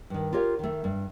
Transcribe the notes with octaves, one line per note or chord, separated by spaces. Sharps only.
G2 D#3
F4 G4 A#4 C#5 F5
D#3 A3
G2